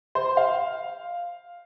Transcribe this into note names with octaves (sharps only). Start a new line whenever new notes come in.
C5
F5